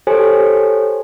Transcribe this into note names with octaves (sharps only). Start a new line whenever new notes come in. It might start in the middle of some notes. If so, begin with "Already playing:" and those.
G4 A4 C5 C#5 G#5